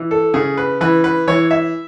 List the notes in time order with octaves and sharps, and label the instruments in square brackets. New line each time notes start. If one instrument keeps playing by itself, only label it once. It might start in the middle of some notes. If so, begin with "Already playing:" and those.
Already playing: [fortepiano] E3
A4
C#3 G#4
B4
E3 B4
B4
E3 C#5
E5